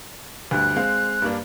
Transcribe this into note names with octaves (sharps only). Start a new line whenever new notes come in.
D2 G2 F#6
G#3 C4 F5
G2 A#3 D4